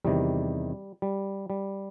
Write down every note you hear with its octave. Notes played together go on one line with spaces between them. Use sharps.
E2 C3 D#3 G3
G3
G3